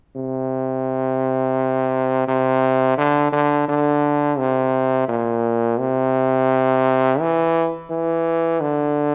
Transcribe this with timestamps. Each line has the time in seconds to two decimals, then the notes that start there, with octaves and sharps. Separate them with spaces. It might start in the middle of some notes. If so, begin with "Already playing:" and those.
0.16 C3
2.28 C3
2.98 D3
3.33 D3
3.69 D3
4.38 C3
5.09 A#2
5.80 C3
7.20 E3
7.90 E3
8.61 D3